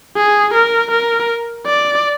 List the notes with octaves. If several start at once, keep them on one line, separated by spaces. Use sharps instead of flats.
G#4
A#4
A#4
D5